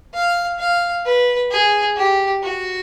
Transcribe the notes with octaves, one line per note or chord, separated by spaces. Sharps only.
F5
F5
B4
G#4
G4
F#4